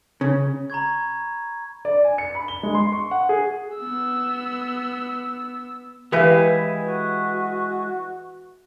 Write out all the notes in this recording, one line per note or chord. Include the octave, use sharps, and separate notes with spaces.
C#3
A#5 B5 C#6 G#6
D5
G#5
C#7
B5
G7
G#3
C6
C#6
F#5
G#4
B3 E6
E3 G#3 E4 G4 B4 F5 G#5
F#4